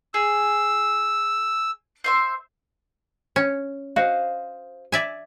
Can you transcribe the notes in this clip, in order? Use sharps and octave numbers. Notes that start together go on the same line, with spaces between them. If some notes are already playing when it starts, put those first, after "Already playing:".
G#4 E6
C5 E5 C6
C#4
F#4 C5 D#5 F5
D5 E5 G#5